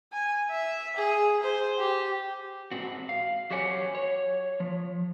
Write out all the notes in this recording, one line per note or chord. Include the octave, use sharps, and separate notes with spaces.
G#5
E5
G#4
C5
G4
G#2 C4 F#4
F5
F#3 G4 C5 C#5 F#5 G#5
C#5
F3